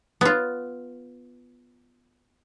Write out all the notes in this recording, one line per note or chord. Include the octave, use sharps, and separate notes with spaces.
B3 F4